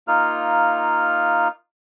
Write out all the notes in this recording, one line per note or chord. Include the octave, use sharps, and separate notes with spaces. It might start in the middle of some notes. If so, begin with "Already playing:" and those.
A#3 D#4 F4 F6